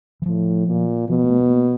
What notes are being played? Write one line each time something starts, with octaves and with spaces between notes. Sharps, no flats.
E3
A2 F3
A#2
B2 F3
A#3
A3
B3
A#3